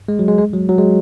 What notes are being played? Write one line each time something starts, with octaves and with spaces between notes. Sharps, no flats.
G#3
F#3
G#3
G#3
F#3
F#3
G#3